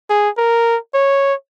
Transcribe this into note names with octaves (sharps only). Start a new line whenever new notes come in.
G#4
A#4
C#5